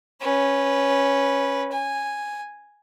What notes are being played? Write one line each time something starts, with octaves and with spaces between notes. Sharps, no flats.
C#4 B4
G#5